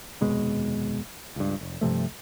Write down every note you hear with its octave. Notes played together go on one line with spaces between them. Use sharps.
F1 D#2 B2 G#3
C#2 G2
F1
G2 C3 F3 A3